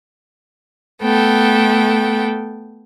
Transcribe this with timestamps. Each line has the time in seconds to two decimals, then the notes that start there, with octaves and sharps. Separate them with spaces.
1.02 A3 B3 A4 G5